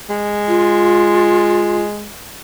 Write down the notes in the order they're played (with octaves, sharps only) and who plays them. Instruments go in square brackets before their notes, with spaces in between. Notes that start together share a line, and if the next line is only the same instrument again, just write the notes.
[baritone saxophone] G#3
[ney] F4